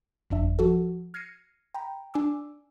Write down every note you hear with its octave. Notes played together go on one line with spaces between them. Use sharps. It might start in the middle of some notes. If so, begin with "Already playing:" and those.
G1 F2 D4 E5
F3 F#4 A4
F6 G#6 A#6 C7 C#7 D#7
G5 A#5 B5
D4 G#5 D6 E6